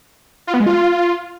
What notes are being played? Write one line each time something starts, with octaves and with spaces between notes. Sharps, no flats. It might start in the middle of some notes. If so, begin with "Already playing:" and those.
F4
B3
G#3
F4